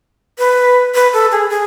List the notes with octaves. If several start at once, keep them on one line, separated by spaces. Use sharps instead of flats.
B4
B4
A4
G#4
G#4